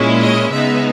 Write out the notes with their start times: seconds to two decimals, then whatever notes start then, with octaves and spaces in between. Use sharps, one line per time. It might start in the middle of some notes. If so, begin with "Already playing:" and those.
Already playing: A#2 G#3 C#4 E4
0.22 D#5
0.52 C#3 G#3 B3 D#4 E5